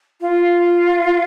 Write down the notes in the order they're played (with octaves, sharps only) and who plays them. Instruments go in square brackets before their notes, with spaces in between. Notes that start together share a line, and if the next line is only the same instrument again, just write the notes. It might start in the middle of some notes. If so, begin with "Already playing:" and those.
[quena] F4